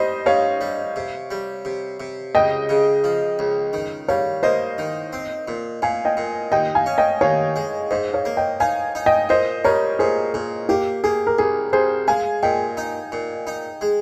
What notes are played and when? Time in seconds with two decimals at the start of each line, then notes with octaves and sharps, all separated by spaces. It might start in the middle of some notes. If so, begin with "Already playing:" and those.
Already playing: G3 C5 D#5
0.26 G2 C#5 F5
0.61 G3
0.96 C3
1.31 G3
1.65 C3
2.00 C3
2.35 C#2 D#5 G5
2.69 C#3
3.04 F3
3.39 C#2
3.73 D#3
4.08 G3 C#5 F5
4.43 A#3 C5 D#5
4.78 D#3
5.13 C4
5.48 A#2
5.82 A#2 F5 G#5
6.05 D#5 G5
6.17 A#2
6.52 D#2 D#5 G5
6.75 F5 G#5
6.86 C#4
6.98 D#5 G5
7.21 D#2 C#5 F5
7.56 G#3
7.91 G#2 C5 D#5
8.13 C#5 F5
8.25 A#3
8.37 D#5 G5
8.60 D#4 F5 G#5
8.95 D#4
9.06 D#5 G5
9.29 A#2 C5 D#5
9.65 G3 A#4 C#5
9.99 A#2 G#4 C5
10.34 A#2 G#4
10.69 A#3 G4
11.04 A#3 G#4
11.27 A#4
11.38 C2 G#4
11.73 C2 G#4 C5
12.08 G#3 F5 G#5
12.43 A#2 D#5 G5
12.77 D#4
13.12 A#2
13.47 D#4
13.81 G#3